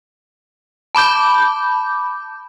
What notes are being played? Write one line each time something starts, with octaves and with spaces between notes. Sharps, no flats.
A5 B5 D6 G6